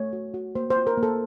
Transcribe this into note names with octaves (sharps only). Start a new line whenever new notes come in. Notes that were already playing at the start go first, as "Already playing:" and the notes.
Already playing: A3 C#5
F#4
F#4
A#3 C5
C5
F4
A#4
A#3
A4